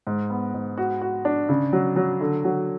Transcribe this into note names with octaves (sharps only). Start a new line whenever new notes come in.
G#2
B3
G#2
F#4
F#4
D4
C#3
F#3
F#3
D3
F#3